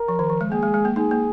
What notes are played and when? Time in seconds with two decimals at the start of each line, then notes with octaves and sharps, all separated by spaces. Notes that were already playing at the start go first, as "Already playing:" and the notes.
Already playing: A#4
0.08 F3
0.19 D#3
0.30 F3
0.41 G#3
0.52 A#3 G#4
0.63 G#3
0.74 G#3
0.85 A#3
0.96 A#3 D#4 G#4
1.11 A#3